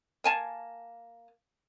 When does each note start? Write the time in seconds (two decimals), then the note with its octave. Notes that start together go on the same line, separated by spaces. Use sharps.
0.24 A#3 G#5 A5